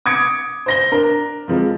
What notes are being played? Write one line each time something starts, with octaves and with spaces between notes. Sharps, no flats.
D6 D#6 G#6 C#7 D7
C5 A#6 G7
D4 A#4
C3 F3 G#3